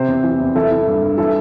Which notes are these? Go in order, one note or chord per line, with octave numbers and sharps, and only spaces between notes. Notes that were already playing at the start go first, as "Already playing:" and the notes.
Already playing: C3 G4 C5
E2
E3
E2
E3 E4 A4
E3
G2
G2
E3 E4 A4